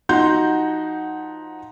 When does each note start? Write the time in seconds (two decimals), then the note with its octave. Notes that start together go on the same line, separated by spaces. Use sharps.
0.09 F3 D#4 F#4 F#5 C6 G6